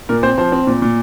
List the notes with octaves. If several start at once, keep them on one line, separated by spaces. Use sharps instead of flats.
A#2 A#4
C4 C5
F3 C5
C4
A#2
A#2